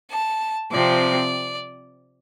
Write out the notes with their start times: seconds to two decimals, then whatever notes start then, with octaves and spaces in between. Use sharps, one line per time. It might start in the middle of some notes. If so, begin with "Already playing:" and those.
0.10 A5
0.71 C3 F3 C4 D5